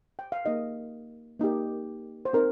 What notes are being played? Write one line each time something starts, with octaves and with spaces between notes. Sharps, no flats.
G5
F5
A#3 D#4 G4 D#5
A#3 D#4 G4
C5
C4 D#4 A#4